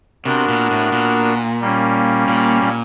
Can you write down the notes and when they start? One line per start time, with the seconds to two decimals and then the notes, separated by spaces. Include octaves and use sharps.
0.25 C3 B3 D4 F#4 A#4
0.49 A#2
0.71 A2
0.92 A#2
1.61 G3 A#3 C#4
2.28 A#2
2.62 A#2